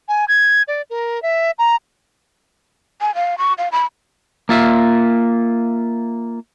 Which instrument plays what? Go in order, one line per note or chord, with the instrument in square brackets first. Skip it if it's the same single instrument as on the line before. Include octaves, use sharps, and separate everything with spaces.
[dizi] G#5
G#6
D5
A#4
E5
A#5
[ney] G#5
F5
C#6
F5
B5
[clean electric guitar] A#3 F4 E5